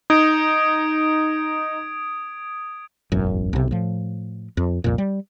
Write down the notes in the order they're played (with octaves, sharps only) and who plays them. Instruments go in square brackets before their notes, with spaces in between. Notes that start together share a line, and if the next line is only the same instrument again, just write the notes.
[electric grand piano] D#4 [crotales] D#6 G#6 D7
[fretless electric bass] E1 A1 F#2
B1 C3
A2 F3
F2
C2 F2 A#2
G3